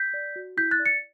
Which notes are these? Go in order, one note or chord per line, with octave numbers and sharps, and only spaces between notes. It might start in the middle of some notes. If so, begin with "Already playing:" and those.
Already playing: G6 B6
D5
F#4
E4 G6 B6
F#6 A6
D5
A6 C#7